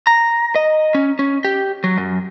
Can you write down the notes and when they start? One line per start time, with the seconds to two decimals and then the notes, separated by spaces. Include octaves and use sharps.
0.07 A#5
0.55 D#5
0.95 C#4
1.19 C#4
1.44 G4
1.84 F#3
1.98 F#2